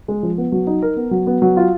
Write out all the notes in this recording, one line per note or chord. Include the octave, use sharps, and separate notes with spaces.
G#3
F3
B3
F#3
D#4
A#4
B3
F#3
B3
F#3
F4